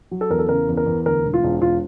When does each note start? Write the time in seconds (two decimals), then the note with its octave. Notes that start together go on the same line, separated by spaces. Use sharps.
0.11 F#3
0.21 A4
0.30 E2 A#4
0.39 A4
0.48 C#3 A#4
0.68 E2
0.77 A#4
0.86 E2
1.06 D2 A#4
1.24 E1
1.34 F4
1.44 E1
1.62 E1 F4